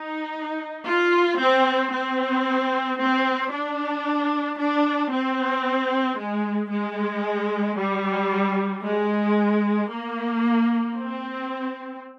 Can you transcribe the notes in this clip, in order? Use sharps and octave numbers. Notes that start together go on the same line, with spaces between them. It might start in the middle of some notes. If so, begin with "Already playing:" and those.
Already playing: D#4
F4
C4
C4
C4
D4
D4
C4
G#3
G#3
G3
G#3
A#3
C4